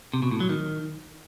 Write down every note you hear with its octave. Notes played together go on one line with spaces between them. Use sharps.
C3
B2
A2
F#3
D#3